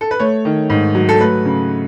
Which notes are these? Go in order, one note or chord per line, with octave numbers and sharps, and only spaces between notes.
A4
B4
A3 C#5
D#3
G#2
F#3
A4
A3 B4
C#3